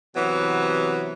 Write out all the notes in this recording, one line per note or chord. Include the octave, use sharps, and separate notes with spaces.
C3 E3 F#3 B3